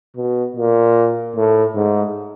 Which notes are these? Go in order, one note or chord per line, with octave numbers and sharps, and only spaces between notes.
B2
A#2
A2
G#2